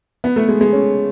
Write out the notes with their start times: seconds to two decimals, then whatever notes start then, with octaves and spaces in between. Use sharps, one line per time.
0.24 B3
0.36 A3
0.48 G#3
0.61 G#3
0.73 C#4